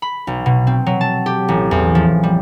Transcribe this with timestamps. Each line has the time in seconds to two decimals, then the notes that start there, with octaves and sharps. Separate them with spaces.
0.02 B5
0.27 B1
0.46 B2
0.67 C4
0.86 F#3
1.01 A5
1.26 G4
1.48 A1
1.71 E2
1.95 F3
2.23 G3